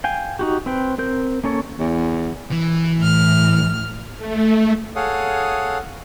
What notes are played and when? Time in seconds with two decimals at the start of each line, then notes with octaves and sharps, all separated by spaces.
0.04 F5 G5 G#5
0.39 D#4 F#4 G4
0.66 C4 B4 G5
0.98 C4 A#4 G6
1.44 A#3 C#4 A4 C#5
1.79 E2
2.52 E3
2.99 A2 F6
4.17 A3
4.96 G#4 A4 C#5 F5 F#5 D#6